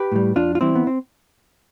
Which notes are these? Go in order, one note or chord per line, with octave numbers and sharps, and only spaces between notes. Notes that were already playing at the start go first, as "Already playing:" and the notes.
Already playing: G4 B4
A2 G3
F2 D4 F4
F4
E3 G3 C4 E4
B3
C4